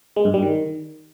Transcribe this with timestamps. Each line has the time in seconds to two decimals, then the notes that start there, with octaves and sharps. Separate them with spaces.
0.16 G#3
0.25 G2
0.34 G3
0.43 D#3